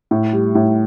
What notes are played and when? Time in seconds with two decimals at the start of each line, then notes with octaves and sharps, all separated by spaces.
0.11 A2
0.33 G3
0.55 A2